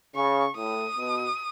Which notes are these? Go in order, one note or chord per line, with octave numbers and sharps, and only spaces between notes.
C#3 C#6
A2 D#6
B2